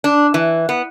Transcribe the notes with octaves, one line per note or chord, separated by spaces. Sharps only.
D4
E3
B3